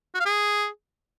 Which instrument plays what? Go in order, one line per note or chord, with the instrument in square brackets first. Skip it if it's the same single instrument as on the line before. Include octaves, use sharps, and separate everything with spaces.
[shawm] F#4
F5
G#4